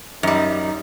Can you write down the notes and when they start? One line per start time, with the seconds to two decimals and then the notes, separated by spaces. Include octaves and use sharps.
0.23 F#2 G3 D#4